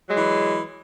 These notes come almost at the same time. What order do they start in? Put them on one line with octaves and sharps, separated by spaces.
F#3 G#3 E3